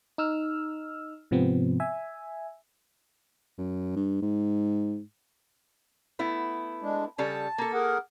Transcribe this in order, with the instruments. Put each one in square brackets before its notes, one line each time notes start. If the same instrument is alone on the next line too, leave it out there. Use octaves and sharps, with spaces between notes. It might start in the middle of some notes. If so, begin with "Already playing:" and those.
[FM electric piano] D#4 E6 F6
G#2 C3 F3 B3 C4
E5 G#5
[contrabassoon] F#2
G2
G#2
[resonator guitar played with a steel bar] A3 B3 E4
[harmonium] G#3 D4
[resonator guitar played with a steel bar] C#3 G3 A4 [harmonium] A5
[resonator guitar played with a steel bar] A#3 A4
[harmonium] G#4 A#4 F#5